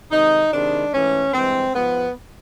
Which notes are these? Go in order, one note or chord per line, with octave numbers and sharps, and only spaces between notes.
C3 D#3 G#3 D#4
C3 D#3 G#3 D4
G#2 E3 A3 C#4
G2 E3 G#3 C4
G#2 F3 G#3 B3